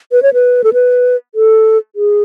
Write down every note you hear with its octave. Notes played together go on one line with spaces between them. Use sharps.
B4
C#5
B4
A4
B4
A4
G#4